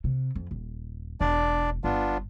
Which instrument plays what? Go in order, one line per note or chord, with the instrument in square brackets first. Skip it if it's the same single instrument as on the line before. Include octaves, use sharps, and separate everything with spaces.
[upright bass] C3
F2
D#1
[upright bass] E1 [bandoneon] D4 D5
[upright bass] G1 [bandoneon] B3 D4 F4